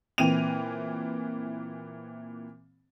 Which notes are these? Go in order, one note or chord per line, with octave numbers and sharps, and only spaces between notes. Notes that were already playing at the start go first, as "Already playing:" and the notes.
A#2 E3 C4 D#7 F7